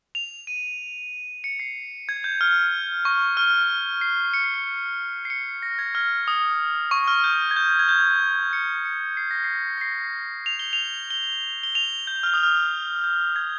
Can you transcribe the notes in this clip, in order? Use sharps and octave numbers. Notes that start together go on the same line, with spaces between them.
F7
D#7
C#7
C7
G#6
G6
F6
C#6
F6
C7
C#7
C7
C#7
C7
C#7
A#6
G#6
F6
D#6
C#6
F6
G6
G#6
G6
G#6
G6
C#7
C#7
C7
A#6
C7
A#6
C7
F7
G7
F7
G7
G7
F7
G6
F6
D#6
F6
G6
G#6